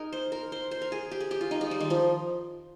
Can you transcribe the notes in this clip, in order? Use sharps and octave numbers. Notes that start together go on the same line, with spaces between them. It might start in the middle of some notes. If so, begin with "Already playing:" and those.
Already playing: D#4 G#4 A#4
C5
A#4
C5
C5
A#4
G#4
G4
G#4
G4
F4
D#4
G#3
G3
D#3
F3